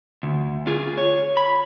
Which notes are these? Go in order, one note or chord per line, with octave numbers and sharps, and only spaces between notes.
D2
F4 G#4
C#5
B5